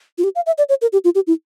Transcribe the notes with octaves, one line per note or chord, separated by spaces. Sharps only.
F4
G4
F5
E5
D5
C#5
A#4
G4
F4
G4
E4